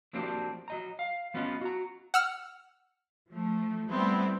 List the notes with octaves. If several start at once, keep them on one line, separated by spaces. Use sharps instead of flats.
F3 F#3 A#3 C4 D4 G4
F#3 D#5 A#5
F5
F#3 B3 C#4 F4 A#4 D#5
F#4 A#5
F#5 E6 F6
F3 A3
G3 A3 B3 C4 E4